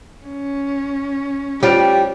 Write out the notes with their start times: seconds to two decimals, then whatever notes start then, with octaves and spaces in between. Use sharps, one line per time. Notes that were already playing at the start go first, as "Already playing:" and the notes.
0.25 C#4
1.63 G3 F4 G4 C5 C#5